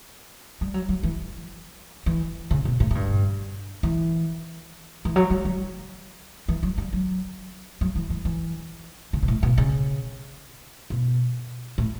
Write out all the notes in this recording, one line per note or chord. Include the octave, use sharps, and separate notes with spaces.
G3
F#3
F#3
E3
E3
C#3
B2
A2
A2
G2
E3
E3
F#3
G3
F#3
E3
F#3
G3
F#3
F#3
E3
E3
E3
C#3
B2
A2
B2
C#3
B2
A2